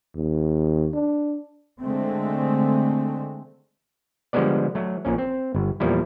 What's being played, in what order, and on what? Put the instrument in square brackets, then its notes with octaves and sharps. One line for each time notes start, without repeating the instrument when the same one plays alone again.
[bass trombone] D#2
D4
[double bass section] D3 G#3 A3 C4
[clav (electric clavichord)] D3 F3 G3 G#3 B3 D5
F#3 A3
A#1 A#2 C#4
C4
G1
E2 A#2 F3 G3 E4